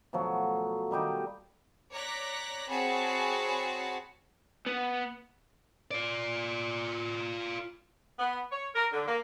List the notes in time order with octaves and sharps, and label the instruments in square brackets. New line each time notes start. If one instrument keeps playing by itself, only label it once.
[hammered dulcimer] B2 F3 F#3 A3
D#3 G3 D#4 G4
[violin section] C#5 D5 A#5 F#6 A#6 B6
C4 F#4 G#4 C#5 A5 B5
[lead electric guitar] B3
F4 D5
[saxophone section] B3
C#5
A#4
D3
A#3